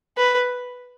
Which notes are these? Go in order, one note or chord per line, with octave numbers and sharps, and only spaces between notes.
B4